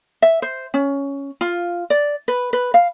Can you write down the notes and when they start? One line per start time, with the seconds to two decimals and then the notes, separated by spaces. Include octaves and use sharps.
0.22 E5
0.42 C5
0.74 C#4
1.41 F4
1.90 D5
2.28 B4
2.53 B4
2.74 F5